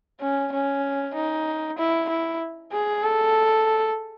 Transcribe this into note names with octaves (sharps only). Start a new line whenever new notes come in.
C#4
C#4
D#4
E4
E4
G#4
A4